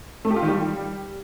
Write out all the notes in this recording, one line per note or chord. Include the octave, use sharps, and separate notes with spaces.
A3
G4
F4
D#3
G3